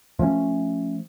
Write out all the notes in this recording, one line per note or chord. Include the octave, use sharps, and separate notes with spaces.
F3 A3 C#4